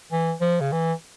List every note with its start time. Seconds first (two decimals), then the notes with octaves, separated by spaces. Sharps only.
0.12 E3
0.41 F3
0.61 C#3
0.72 E3